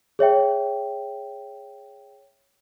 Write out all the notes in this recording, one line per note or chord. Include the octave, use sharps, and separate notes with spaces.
G#4 C#5 E5 G5